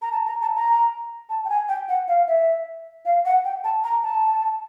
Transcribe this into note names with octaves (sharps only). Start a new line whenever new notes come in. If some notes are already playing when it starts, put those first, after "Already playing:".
A#5
A5
A#5
A5
A#5
A5
G5
G#5
G5
F#5
F5
E5
F5
F#5
G5
A5
A#5
A5